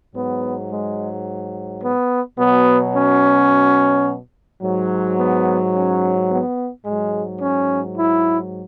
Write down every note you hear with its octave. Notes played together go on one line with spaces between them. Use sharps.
G#2 F#3 B3
G#3
B3
B2 F#3 B3
C#4
G#2 F#3
B3
C#4
B3
G#2 F#3 G#3
C#4
E4